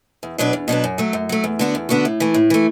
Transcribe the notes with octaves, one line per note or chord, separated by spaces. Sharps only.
E2
B2 F#3 D4 B4
E2
B2 F#3 D4 B4
F#2
F#3 A3
F#2
F#3 A3
E2
D3 B3 D4 F#4
E2
D3 B3 D4 F#4
A2
E3 A3
A2
E3 A3